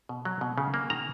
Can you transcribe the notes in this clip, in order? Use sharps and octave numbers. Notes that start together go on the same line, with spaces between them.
B2
F#3
B2
C#3
A#3
D#3 A#5